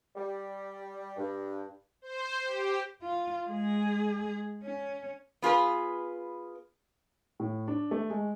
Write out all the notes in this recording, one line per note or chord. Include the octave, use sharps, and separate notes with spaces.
G3
G2
C5
G4
F4
G#3 G#4
C#4
B3 F4 G#4 B4
A2
D4
A3
G#3